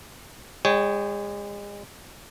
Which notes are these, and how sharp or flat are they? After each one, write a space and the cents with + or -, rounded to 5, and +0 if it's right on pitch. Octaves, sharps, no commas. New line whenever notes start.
G#3 -35 C#5 +0 G5 +0